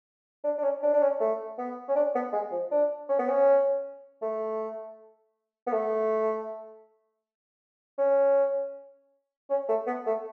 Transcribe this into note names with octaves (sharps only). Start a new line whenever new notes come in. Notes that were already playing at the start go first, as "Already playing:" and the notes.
D4
D4
C#4
D4
D4
C#4
A3
B3
C#4
D4
B3
G#3
F3
D4
C#4
B3
C#4
A3
B3
A3
C#4
C#4
A3
B3
A3